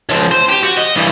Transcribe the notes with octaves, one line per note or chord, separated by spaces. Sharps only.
C#2 F3
C5
G4
F#4
D#5
G2 E3